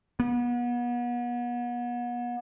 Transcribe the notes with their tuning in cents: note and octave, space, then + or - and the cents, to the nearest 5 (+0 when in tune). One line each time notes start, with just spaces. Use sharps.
B3 -35